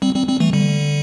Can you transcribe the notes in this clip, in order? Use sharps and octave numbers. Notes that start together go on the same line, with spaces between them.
G3 C4
G3 C4
G3 C4
E3 A3
D3 G3